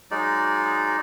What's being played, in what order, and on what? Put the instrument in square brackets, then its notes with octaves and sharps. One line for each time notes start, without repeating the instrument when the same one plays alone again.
[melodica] F#3 G#3 D#4 D5